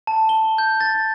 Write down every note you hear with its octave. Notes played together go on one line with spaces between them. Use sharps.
A5
G7
G6
A6